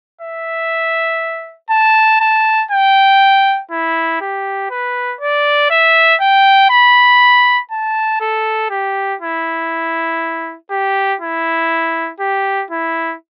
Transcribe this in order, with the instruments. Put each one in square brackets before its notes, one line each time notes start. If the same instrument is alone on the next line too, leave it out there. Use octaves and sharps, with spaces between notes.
[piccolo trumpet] E5
A5
A5
G5
E4
G4
B4
D5
E5
G5
B5
A5
A4
G4
E4
G4
E4
G4
E4